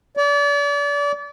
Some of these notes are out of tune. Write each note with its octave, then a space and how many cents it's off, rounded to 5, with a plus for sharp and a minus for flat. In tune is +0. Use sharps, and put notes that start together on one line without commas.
D5 -35